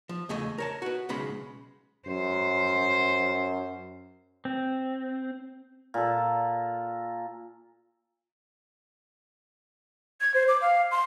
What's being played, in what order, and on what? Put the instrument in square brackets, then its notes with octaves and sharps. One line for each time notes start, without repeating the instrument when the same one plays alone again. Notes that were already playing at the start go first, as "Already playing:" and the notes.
[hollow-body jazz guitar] F3
E2 C#3 A3 G#4 D#5
A#4 C#5 A5
F#4 B4
B1 C#3 G#3 B5
[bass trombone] F#2 [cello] C5
[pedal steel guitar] C4
[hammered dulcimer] A#2 A4
[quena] G#6
C5
D6
F5
C6